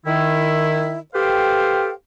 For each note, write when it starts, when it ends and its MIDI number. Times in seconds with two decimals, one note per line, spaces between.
0.06 0.98 51
0.06 0.98 64
1.14 1.90 67
1.14 1.90 69
1.14 1.90 71
1.14 1.90 72
1.14 1.90 77
1.14 1.90 79